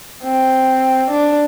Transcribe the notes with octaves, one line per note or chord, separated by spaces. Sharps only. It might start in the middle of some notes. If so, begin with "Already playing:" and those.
C4
D4